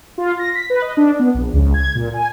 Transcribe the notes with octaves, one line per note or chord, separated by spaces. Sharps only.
F4
A#6
B6
B4
D#5
D4
B3
A#1
C#2
G#6
A#2
G#5